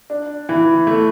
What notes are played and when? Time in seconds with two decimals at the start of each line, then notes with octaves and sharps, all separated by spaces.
0.10 D4
0.49 E3
0.87 A3